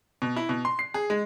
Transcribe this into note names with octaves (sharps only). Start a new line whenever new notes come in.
B2
E4
B2
C6
C7
G#4
G#3